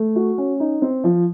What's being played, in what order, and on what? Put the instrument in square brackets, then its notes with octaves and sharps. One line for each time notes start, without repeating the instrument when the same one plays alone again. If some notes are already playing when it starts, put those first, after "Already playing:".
Already playing: [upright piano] A3
F#4
C#4
D#4
C4
F3